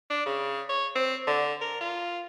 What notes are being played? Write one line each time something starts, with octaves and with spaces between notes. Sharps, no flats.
D4
C#3
C#5
C4
D3
A#4
F4